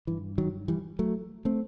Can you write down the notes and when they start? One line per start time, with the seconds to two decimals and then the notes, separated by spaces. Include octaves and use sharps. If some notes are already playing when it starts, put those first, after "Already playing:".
0.07 G2 E3
0.38 D#3 F#3
0.68 E3 G3
0.99 F#3 A3
1.45 A3 C4